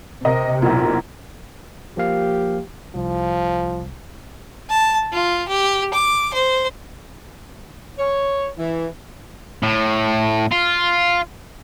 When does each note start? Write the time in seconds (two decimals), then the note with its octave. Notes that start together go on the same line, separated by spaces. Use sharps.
0.25 C3 A#4 D#5
0.62 B1 E2 A#2 D#4 E4
1.97 F3 A#3 G4 F5
2.95 C2 F3
4.70 A5
5.13 F4
5.48 G4
5.94 D6
6.34 C5
7.98 C#5
8.58 E3
9.63 A2
10.51 F4